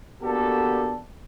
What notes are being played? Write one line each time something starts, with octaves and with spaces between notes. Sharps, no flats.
A#3 B3 D4 F#4 G4 A4